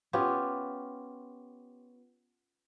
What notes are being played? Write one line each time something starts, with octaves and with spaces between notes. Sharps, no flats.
B3 C#4 F4 G4